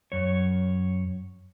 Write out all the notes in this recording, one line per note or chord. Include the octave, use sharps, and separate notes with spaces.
F#2 C#5